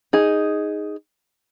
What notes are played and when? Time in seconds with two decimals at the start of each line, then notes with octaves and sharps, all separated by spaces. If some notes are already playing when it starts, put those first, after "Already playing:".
0.13 D#4 G#4